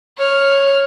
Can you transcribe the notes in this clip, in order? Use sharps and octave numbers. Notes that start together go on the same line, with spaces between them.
C#5 F6